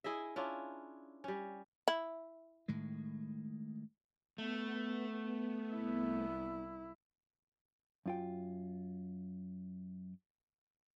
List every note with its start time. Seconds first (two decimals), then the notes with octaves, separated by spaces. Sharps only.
0.04 E4 G#4 D#5 E5
0.36 C#4 D4 E4 F4
1.24 G3 C#4
1.88 E4
2.68 A2 D#3 G#3
4.38 A3 B3
5.73 C2 E4
8.06 F#2 F4 G5